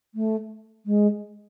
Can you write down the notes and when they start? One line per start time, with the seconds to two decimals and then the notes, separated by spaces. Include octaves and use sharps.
0.15 A3
0.86 G#3